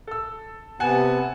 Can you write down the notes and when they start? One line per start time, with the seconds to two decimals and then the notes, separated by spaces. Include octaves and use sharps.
0.07 A4 E6
0.80 C3 B3 F#5 G#5 A5